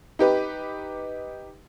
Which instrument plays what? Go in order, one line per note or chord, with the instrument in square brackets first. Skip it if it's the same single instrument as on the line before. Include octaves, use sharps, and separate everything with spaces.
[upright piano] D#4 G4 B4